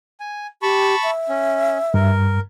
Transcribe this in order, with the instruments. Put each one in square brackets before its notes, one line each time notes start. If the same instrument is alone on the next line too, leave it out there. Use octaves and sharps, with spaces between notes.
[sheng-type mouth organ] G#5
[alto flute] G4 [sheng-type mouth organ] A5 B5 C#6
[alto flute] E5
[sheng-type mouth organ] C#4
[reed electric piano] G2 [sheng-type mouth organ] A#4